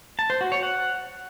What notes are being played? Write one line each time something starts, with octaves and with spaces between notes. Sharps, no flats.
A5
C5
F#4
C#5
F#5